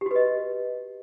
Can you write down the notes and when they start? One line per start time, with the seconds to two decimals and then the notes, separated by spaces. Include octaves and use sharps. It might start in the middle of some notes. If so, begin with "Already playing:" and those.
0.01 G4
0.06 F#4
0.11 B4
0.16 D#5